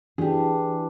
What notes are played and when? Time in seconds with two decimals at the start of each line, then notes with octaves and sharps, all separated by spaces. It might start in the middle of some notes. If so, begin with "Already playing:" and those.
0.18 E3 D4 G4 G#4